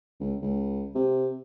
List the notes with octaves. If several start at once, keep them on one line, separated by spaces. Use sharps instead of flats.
C#2
C#2
C3